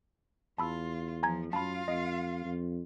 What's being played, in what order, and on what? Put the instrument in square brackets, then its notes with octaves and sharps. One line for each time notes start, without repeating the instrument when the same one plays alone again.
[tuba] E2 [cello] F4 [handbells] A5 B5 E6
[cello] F3 [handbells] G#5 A#5 G#6
[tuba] F#2 [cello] F4 F5 [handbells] A5 B5
[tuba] F2 [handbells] D#5
[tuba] F2